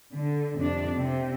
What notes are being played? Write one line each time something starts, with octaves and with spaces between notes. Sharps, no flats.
D3
F2 C3 D4
C3 C4